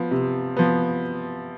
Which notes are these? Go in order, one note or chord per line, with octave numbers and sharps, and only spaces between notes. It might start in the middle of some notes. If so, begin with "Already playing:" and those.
Already playing: F3 B3
C3
F3 B3